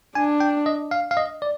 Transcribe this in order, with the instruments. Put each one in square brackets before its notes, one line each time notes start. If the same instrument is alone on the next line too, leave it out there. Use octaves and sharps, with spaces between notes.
[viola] D4 [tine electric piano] G#5
[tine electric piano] G5
D#5
F5
F5
D#5
D5